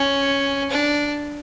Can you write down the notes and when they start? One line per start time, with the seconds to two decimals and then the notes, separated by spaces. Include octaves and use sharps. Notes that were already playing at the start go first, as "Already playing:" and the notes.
Already playing: C#4
0.71 D4